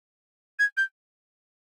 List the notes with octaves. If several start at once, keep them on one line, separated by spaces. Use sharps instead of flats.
G#6
G6